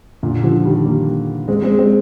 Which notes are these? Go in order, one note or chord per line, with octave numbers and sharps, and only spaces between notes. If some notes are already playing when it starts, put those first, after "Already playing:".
A#2 D3
D3 F3
D#3 G3
G3 A#3
G#3 C4
G#3 C4
G#3 C4